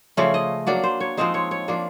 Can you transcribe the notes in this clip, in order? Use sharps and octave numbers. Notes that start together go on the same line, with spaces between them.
C#3 F3 A3 C#4 D5
D#5
F#3 A#3 D4 D5
C5
C#5
F3 G#3 C4 D#4 C5
C#5
C#5
F3 A#3 D4